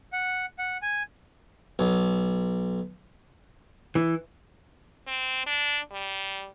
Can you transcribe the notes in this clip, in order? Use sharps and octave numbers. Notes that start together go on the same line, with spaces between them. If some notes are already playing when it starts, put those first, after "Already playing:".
F#5
F#5
G#5
B1
E3
C4
D4
G3